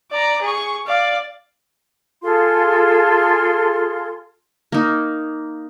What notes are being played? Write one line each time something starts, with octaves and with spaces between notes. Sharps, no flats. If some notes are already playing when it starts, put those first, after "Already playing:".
D5 A#5
G#4 C#6
D5 F5
F4 G#4 A4 C6
A#3 D#4